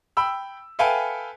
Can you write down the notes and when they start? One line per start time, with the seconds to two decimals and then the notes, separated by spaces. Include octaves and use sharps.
0.17 G5 B5 E6
0.79 A4 B4 E5 F5 G5 G#5